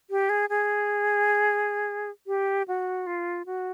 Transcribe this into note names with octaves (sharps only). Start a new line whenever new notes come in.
G4
G#4
G#4
G4
F#4
F4
F#4